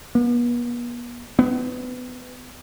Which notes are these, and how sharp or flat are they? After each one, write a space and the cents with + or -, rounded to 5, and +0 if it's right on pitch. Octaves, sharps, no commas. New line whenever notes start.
B3 -40
B3 +25